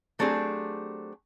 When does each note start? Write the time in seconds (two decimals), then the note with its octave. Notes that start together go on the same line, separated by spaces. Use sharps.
0.19 F#3 A3 C4 D4 G4 G#4